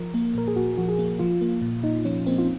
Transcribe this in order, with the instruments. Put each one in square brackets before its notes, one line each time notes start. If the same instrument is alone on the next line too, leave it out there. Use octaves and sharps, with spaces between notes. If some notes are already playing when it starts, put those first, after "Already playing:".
Already playing: [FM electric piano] F3 A#4
A#3
A#2 A#4
G#4
A#2 F#4
F3 F#4
G#4
A#3
F3 F4
A#3
A#2
A#2 D#4
F3 C#4
A#3 C4
F4